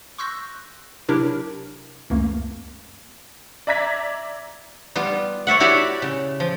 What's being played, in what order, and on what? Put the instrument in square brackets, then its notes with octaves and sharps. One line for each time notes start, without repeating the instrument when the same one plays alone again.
[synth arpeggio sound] C6 C#6 E6 F#6 G6 A#6
C3 F#3 D4 E4 G4 A#4
C#2 F#2 E3 A3 A#3
[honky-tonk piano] D5 E5 A#5 G#6 B6
[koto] G3 B3 F4
C#5 D5 E5 F#5
E4 F#4 G4 C#5 D5 E5
C#3
F3